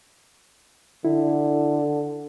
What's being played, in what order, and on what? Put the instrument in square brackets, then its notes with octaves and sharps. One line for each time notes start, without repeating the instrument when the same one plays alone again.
[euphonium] D3 [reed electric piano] E4